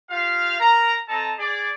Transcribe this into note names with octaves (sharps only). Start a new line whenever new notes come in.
F4 G4 F5
A#4 A#5
C4 A4 D#5 A5 A#5
G#4 D5